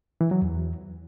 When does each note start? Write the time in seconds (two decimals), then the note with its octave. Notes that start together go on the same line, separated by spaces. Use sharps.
0.21 E3
0.31 F#3
0.42 E2